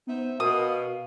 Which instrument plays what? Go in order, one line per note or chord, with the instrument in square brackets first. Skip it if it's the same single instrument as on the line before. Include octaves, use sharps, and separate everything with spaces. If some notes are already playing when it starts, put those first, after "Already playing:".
[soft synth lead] B3 [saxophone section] D#4 C5 E5
[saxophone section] B2 [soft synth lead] A#4 [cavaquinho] D#6
[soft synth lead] F5